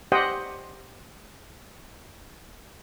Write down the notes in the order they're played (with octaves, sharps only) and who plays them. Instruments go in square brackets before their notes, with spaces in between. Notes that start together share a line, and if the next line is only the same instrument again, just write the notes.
[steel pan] G4 C5 D#5 F#5 G5